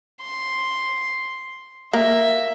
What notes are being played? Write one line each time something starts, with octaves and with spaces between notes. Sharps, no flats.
C6
A#3 E5